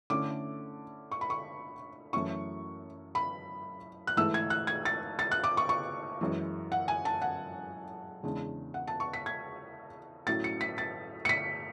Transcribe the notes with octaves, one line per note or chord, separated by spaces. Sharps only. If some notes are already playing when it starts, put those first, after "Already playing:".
D3 A3 C#4 E4 D6
C#6
B5
C#6
F#2 E3 A3 C#4 E4 C#6
B5
F#6
G#2 E3 A3 E4 E6
G#6
F#6
G#6
A6
A6
F#6
D6
C#6
C#6
F#2 E3 G#3
F#5
G#5
A5
F#5
E2 C#3 G#3 D4
F#5
A5
C#6
B6
G#6
A2 F#3 C#4 E4 A6
C#7
B6
A6
C#7
B6